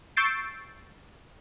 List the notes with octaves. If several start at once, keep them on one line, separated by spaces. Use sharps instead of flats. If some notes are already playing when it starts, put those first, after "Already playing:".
C#6 E6 G6 A6 C7 D7